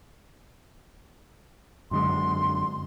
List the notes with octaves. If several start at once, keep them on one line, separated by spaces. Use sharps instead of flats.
F#2 D3 G#3 C6